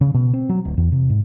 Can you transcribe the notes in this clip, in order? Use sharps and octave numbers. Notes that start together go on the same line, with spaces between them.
C#3
B2
C4
F#3
D1
E2
C3
G#2